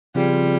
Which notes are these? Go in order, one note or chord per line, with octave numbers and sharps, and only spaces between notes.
C#3 F3 G3 C4 F4 G#4